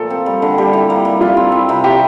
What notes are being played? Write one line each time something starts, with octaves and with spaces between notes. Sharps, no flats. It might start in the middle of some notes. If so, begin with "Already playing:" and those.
Already playing: A#2 F3 A3 A4
C4
G3
D3
G3 G4
E4
A#3
G3
E4 F4
C4
G3
C3
E4 G4